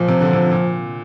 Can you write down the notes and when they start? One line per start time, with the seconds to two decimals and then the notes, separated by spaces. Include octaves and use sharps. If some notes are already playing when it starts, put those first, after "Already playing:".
Already playing: A#2 F3
0.08 C3
0.21 D3
0.33 C3
0.52 A#2